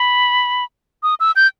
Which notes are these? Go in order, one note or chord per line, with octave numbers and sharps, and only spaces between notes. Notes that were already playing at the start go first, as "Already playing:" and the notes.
Already playing: B5
D#6
E6
G6